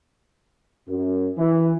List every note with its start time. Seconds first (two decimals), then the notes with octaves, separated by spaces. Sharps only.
0.88 F#2
1.38 E3